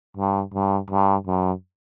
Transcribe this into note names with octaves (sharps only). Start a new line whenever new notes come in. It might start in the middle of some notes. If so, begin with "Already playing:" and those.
G2
G2
G2
F#2